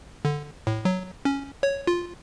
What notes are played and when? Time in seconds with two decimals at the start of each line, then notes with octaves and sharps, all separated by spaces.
0.25 D3
0.67 A2
0.85 F#3
1.25 C#4
1.63 C#5
1.87 F4